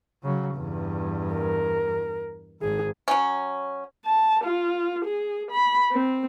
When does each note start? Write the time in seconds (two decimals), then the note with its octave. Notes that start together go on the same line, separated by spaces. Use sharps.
0.23 C#3 F#3
0.56 E2 G2
1.34 A#4
2.62 G#1 G#4
3.08 F#3 C#4
4.05 A5
4.44 F4
5.05 G#4
5.51 B5
5.92 C4